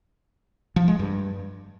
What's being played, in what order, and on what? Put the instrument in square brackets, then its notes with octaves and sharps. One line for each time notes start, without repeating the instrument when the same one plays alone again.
[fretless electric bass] F3
G#3
G2